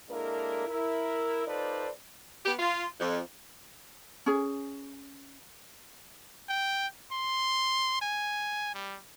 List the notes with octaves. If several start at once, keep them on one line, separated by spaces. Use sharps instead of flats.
G#3 A#3 D4 E4 A4 A#4
E4 A#4
D#4 F4 A4 B4 C5 D5
B3 G4
F4
F2
C#4 G#4
G5
C6
G#5
G3